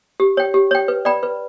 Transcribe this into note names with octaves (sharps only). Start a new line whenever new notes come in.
G4
C#5 G5
G4
C#5 G5
B4
D5 G5 B5
B4